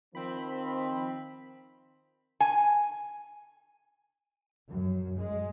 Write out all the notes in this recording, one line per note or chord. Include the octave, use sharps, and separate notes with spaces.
D#3 F3 C4 B5
G#5
F#2
G#3